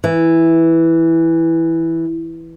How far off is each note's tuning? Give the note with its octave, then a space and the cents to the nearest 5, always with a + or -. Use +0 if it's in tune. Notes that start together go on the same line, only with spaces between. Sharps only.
E3 -5